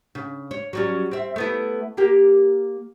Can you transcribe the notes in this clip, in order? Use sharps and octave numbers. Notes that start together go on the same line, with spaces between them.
C#3
C#5
F#3 G3 C#4
C4 E5
A3 B3 E4
A#3 G4